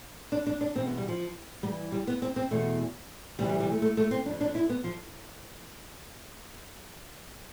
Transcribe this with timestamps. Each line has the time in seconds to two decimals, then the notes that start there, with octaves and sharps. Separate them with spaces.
0.32 D4
0.47 D4
0.61 D4
0.76 E2 B2 C4
0.87 B3
0.98 G3
1.08 F3
1.63 G2 E3 G3
1.92 G3
2.07 B3
2.22 C4
2.36 C4
2.51 E2 B2 A3
3.39 D2 C3 E3 G3
3.49 G3
3.60 G3
3.71 A3
3.82 A3
3.97 A3
4.11 C4
4.26 F2 D4
4.30 D3
4.41 D4
4.55 E4
4.69 B3
4.84 F3